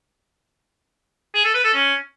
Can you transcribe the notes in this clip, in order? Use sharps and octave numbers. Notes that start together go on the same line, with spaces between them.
G#4
A4
B4
A4
C#4